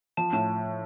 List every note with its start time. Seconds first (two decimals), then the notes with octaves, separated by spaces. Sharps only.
0.17 F3 A5
0.33 A2 A5